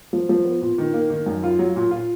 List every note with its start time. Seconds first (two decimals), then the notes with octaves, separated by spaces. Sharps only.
0.13 F3
0.29 F3
0.45 B3
0.62 A#2
0.78 D#3
0.94 A#3
1.10 D#3
1.26 F#2
1.43 F4
1.59 F#3
1.76 A#2
1.91 F4